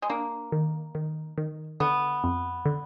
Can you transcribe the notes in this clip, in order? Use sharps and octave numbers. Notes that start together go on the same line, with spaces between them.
G#3
A#3 D4
D#3
D#3
D#3
D3 B3
F2
D3